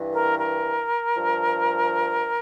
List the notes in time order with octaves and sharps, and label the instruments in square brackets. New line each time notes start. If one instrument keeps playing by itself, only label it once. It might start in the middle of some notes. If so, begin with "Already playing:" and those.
Already playing: [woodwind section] G2 E3
A#4
A#4
G2 F3